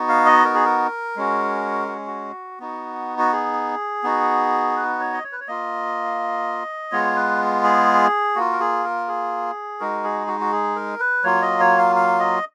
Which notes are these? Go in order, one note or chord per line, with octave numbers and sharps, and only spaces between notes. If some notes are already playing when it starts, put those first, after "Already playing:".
Already playing: B3 D#4 F#4
F5
D#5
A#4
G#4
A#4
G#3 C#4 F#4
F#4
F#4
B3 D#4 F#4
F#4
G#4
B3 D#4 F#4
B4
C#5
D#5
C#5
B4
C#5
A#3 F4 D#5
G#3 B3 F4 C#5
B4
G#4
A#3 F4 F#4
A#4
G#4
A#4
G#4
G#3 D#4 F#4 A#4
G#4
F#4
F#4
G#4
A#4
B4
F#3 A#3 F4 C#5
D#5
C#5
F5
F5
D#5